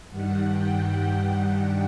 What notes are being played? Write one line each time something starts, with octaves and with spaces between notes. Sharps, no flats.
G2 D#3 G3 F#5
G5